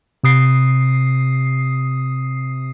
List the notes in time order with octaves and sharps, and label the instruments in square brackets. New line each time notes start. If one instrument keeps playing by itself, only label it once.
[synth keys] C3 D#6 C7